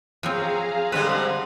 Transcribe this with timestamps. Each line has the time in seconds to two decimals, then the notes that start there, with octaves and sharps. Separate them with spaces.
0.23 F3 F#3 C4 G#4 F5 A#5
0.92 D3 G3 G#3 C4 B4